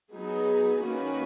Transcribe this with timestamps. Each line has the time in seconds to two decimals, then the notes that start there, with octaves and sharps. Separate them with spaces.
0.13 F#3 B3 D#4 G#4
0.83 D#3 A#3 C#4 F#4 B4